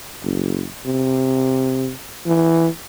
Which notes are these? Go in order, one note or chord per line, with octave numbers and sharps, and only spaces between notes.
F#1
C3
E3